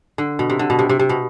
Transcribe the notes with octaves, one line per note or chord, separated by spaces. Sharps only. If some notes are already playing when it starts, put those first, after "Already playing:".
D3
B2
C3
D3
B2
C3
C3
C3
B2